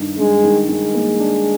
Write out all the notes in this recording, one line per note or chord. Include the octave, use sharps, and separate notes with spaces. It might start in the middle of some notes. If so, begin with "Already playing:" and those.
Already playing: G2 D#3
G2 G#3
D#3
D#3 G#3
A#3
D4